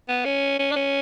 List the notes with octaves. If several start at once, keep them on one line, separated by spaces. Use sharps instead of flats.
B3
C#4
C#4
D4
C#4